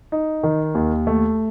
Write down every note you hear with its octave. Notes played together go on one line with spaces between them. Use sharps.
D#4
D#3
D#2
A3